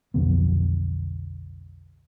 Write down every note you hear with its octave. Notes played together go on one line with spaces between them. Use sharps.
B1 F2 D3 B3